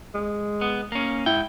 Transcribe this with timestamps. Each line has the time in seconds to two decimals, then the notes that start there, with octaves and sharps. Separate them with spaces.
0.14 G#3
0.61 B3
0.92 A#3 C#4
1.26 G#2 E4 G5